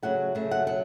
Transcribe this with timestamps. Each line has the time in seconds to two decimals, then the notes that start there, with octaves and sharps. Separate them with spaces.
0.03 C#3 F#3 A3 F#5
0.35 C#3 F#3 A3
0.51 F#5
0.67 B2 F#3 F#5